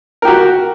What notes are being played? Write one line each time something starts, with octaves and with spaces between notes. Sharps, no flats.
F#4 G4 A#4